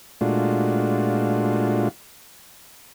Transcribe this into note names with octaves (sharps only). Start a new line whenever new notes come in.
A#2 G#3 A3 D4 F4 F#4